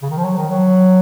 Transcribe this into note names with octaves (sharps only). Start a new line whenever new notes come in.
C#3
D#3
F3
F#3
D#3
F#3